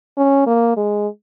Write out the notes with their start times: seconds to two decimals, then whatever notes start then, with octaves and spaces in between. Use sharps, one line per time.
0.17 C#4
0.46 A#3
0.77 G#3